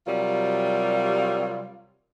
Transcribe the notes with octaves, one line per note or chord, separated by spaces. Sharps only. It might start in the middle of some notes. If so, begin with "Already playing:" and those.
C3 F#3 G3 F4 A#4